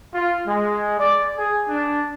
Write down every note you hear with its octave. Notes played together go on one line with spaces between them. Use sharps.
F4
G#3
D5
G#4
D4